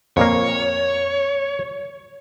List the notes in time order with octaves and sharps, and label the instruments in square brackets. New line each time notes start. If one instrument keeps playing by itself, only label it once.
[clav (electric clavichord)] F2 A#2 A#3 [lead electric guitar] C#5